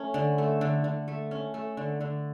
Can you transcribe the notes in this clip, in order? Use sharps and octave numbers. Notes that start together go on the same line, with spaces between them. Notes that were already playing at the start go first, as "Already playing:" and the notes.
Already playing: A3 C#4
D3
A3
D3
D3
A3
C#4
A3
D3
D3